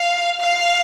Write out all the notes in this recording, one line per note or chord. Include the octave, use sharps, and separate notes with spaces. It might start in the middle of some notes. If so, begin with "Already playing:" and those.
Already playing: F5
F5